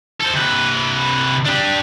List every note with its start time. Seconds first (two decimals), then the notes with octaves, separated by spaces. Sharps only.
0.21 A4 C5
0.34 C3 B4
1.46 D4 G4